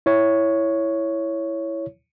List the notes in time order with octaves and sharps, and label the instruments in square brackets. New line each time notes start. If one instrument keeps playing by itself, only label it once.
[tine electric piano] E4 C#5